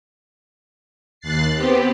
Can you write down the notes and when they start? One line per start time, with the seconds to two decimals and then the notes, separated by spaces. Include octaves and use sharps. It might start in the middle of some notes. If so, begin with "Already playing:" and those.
1.20 D#2 F#6 A6 C7
1.55 B3 C4 G4